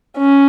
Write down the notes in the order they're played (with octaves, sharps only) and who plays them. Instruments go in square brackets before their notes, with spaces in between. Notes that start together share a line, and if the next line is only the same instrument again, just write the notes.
[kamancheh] C#4